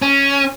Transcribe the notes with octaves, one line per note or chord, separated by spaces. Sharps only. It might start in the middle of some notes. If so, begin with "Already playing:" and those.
C#4